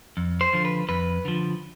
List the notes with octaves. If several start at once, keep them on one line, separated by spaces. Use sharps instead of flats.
F2
C5
D3 F3
B4
F2 B4
D3 F3